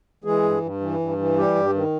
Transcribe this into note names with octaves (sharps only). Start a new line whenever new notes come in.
E3 G#3 G#4
G2
G2
E3
G2
E3
G3 G4
G2
D#3